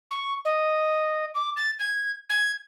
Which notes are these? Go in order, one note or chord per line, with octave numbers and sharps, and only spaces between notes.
C#6
D#5
D6
A6
G#6
G#6